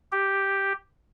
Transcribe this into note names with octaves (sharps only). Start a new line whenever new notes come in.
G4